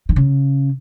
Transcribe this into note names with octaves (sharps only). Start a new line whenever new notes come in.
D#3
C#3